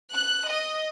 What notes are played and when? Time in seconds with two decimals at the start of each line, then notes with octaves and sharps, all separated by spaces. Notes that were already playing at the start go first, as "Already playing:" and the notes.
0.13 F#6
0.50 D#5